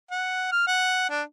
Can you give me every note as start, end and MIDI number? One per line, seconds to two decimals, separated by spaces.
0.11 0.51 78
0.52 0.65 89
0.67 1.06 78
1.10 1.22 62